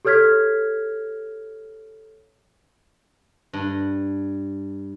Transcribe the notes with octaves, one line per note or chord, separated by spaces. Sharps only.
G4 A4 C#5 F6 G#6 B6
G2